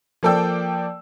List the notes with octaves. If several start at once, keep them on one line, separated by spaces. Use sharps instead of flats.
F3 A#3 A4 D5 G5 E6